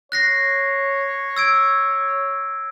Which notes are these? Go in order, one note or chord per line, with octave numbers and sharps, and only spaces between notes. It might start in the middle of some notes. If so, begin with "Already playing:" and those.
C#5 F#6 A#6 C7
E6 G#6 D7